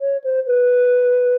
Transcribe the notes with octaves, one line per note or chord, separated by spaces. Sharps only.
C#5
C5
B4